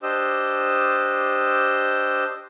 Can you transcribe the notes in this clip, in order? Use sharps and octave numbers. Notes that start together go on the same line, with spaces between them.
D4 G4 C5 D#5 E6